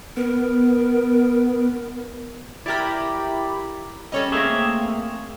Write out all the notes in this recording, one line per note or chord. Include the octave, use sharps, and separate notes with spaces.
B3 A#4
E4 G4 A#4 D5 B5
G3 C#4 A4 C#5 D#5
A3 A#3 C4 G#4 C#5 E5